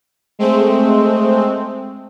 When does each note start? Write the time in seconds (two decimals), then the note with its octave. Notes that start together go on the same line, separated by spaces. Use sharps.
0.39 G#3 A3 C4